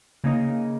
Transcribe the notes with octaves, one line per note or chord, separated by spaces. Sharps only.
C#3 A#3 D#4